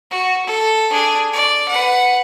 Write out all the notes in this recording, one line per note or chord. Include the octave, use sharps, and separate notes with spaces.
F#4
A4
D4 G#4
D5
B4 F#5